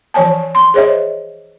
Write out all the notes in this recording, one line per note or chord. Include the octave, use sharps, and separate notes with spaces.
E3 F3 C#5 G#5 A5
C6
G#4 C5 C#5 D#5 E5